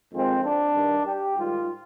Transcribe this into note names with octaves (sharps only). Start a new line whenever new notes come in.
F2 D#3 G#3 C4
D4
G2 D#3 G3
G4
G#2 D#3 G3 F4